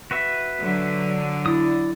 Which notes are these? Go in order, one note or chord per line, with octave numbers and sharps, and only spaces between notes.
F#4 B4 E5
D3 F#3
E4 D5 D#6